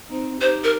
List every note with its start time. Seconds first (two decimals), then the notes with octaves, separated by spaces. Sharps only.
0.09 C4 D#4
0.40 D#4 G4 C5
0.64 A#4